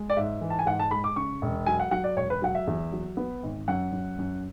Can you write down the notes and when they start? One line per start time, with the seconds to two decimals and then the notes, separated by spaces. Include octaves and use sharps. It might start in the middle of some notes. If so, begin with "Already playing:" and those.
Already playing: G#3
0.10 D5
0.17 G#2 E5
0.41 E3
0.50 A5
0.59 G#5
0.66 G#2 F#5
0.79 A5
0.91 G#3 B5
1.04 D6
1.16 C#3 C#6
1.42 E1
1.66 F#3 G#5
1.80 F#5
1.91 F#3 F#5
2.04 D5
2.17 E1 C#5
2.30 B4
2.42 F#3 F#5
2.55 E5
2.67 E2
2.92 F#3
3.17 B3
3.43 G#1
3.68 F#2 F#5
3.92 F#2
4.18 F#2